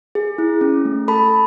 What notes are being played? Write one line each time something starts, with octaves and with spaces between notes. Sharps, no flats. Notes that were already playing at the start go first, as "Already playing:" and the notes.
G#4
E4
C#4
A3
A4 A5 B5